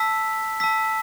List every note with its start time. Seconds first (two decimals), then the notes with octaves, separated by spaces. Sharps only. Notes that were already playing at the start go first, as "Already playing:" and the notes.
Already playing: A5 E6 B6
0.60 A5 E6 B6